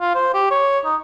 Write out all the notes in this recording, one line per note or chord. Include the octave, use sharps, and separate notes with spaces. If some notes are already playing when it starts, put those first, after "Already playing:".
F4
C5
G4
C#5
D#4